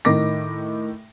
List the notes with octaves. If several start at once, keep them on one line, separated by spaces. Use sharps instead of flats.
A2 D#3 D#4 D6 A#6